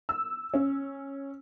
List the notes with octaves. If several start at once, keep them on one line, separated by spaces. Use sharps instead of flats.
E6
C#4